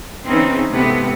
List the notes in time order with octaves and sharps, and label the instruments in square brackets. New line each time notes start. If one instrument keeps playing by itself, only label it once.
[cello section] C#3 E3 B3 C4 D#4
G#2 C3 A3 B3